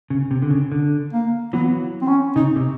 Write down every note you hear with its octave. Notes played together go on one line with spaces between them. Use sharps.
C#3
C3
D3
C#3
D3
A#3
E3 F#3 B3
C4
C#4
C#3 D#4
C3